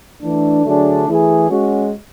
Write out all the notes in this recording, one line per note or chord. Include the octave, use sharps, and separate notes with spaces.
E3 A3 D4
D3 F#3 A3 D4 G#4
E3 A3 E4 G#4
G#3 C#4 F#4